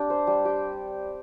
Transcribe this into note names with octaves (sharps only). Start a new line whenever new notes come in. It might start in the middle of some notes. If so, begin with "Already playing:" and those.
Already playing: C4 D4 G4
C5
G3
G4